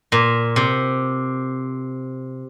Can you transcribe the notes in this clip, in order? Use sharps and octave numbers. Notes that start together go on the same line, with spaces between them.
A#2
C3